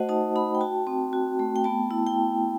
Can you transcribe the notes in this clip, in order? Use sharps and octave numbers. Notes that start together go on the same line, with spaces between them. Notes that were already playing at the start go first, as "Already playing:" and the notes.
Already playing: A3 F#4 C5 D#5 F#5
D#4 A5
D#4 B5
G5
F#4 A5
C4
F#4
A3
G5
B3 A5
E4
G5